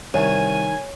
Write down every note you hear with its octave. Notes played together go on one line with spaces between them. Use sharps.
C2 D#3 C#5 G#5